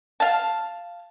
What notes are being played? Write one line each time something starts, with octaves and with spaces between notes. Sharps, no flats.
F5 A5